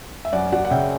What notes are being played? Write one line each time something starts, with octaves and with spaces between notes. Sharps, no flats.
E5
F#2 D5 F#5
F#3 D5 F#5
F#5
C#3 E5 G5